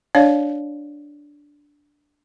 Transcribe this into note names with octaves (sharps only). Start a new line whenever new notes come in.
D4 C#5 D5 F5